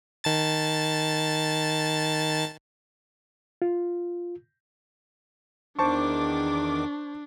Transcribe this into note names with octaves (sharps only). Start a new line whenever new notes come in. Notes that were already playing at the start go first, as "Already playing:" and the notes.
D#3 A5 A6
F4
E2 D#3 D4 C5 A5 C#6 D6